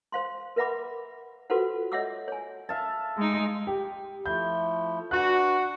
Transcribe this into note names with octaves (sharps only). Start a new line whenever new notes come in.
C5 F5 C6
A#4 B4 E5 F#5 B5 D6
F4 F#4 A4 B4 C5 F#5
C#5 D#5 E5 F#5 D6 E6
C#5 G#5
E5 F5 A5
G#3 D#4
G4
F3 A3 E4 G6
D4 F#4 B4 F#6